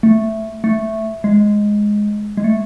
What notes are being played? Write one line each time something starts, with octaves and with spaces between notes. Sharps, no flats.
A3
A3
G#3
G#3
A3